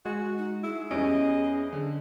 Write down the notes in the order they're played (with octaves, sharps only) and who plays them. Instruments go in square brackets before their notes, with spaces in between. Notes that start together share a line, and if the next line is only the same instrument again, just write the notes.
[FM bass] G#3 [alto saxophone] F#4
[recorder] D#4
[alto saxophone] E4 [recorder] G#4
[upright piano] E2 G3 D7 [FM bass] C#4 [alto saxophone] D#5
[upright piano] D3